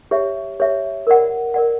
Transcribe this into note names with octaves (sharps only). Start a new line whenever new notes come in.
G4 C#5 E5
G4 C#5 E5
A#4 D5 F#5
A#4 D5 F#5